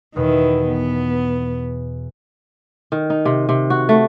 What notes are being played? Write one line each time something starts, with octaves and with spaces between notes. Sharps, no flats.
E2 B2 D#3 E4 B4
B3
D#3
D#4
C3
C3
F#4
A3